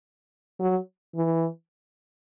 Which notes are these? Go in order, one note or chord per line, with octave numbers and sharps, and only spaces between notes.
F#3
E3